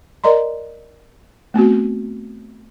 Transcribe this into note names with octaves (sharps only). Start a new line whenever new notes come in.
A#4 D5 D#5 A#5 C6
A3 B3 C4 F#4